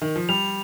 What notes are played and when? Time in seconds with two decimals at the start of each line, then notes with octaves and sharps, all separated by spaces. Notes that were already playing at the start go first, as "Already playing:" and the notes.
0.02 D#3
0.16 F3
0.29 G3 F7